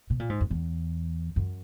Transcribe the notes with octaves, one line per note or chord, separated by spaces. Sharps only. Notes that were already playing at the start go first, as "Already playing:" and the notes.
B2
A#2
G#2
F#2
E2
F#2